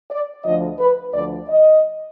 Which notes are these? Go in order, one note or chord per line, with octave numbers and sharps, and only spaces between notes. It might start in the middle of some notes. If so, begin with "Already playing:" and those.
D5
D2 D3 F3 D#5
B4
D2 D3 F3 D5
D#5